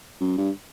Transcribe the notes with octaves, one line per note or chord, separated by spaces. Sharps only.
F#2
G2